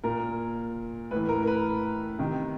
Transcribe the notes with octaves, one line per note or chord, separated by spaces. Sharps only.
A#2 A#4
A2 E3 B4
A#4
A#4
B4
C3 D#3